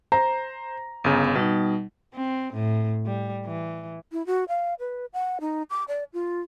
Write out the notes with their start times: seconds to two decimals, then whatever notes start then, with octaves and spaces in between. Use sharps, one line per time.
0.12 C5 A#5
1.04 G1 C#3 B3
1.35 B2 G3 D#4
2.14 C4
2.54 A2
3.06 G3
3.46 E3
4.12 E4
4.26 F#4
4.48 F5
4.79 B4
5.13 F#5
5.41 D#4
5.70 D6
5.88 D5
6.13 F4